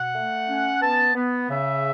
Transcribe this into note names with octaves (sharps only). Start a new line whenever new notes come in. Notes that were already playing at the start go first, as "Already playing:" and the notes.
Already playing: B2 F#5
A3
C#4
B3 A5
B3
C#3 E5